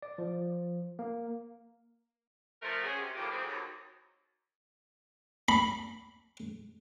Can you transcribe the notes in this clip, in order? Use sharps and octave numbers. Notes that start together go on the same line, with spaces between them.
D5
F3
A#3
F3 A3 A#4
C#4 F#4 G#4
C3
D#2 A2 C3 F3 A#3 G4
F2 C3 G3 C4 G#4
D#2 F#3
B5